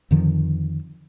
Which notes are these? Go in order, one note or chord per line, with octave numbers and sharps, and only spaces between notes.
F2 D3 D#3 F3